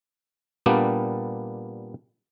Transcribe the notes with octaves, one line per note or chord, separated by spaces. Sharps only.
A#2 G3 A#3 B3 D4 G4